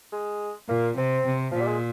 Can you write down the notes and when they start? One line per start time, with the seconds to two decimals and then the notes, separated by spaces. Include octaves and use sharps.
0.12 G#3
0.69 A#2 A#3
0.97 C3 C4
1.26 C3
1.51 A#2 F3
1.60 G3
1.68 G#3